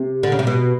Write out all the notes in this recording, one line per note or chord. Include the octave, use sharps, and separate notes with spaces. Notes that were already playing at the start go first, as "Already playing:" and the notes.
Already playing: C3
D3
C#3
C3
B2